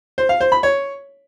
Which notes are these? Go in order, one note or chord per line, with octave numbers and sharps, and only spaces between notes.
C5
F5
C5
B5
C#5